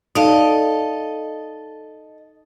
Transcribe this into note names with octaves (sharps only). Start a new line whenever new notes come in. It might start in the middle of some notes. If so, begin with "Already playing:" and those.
D#4 A4 D5 D#5 F5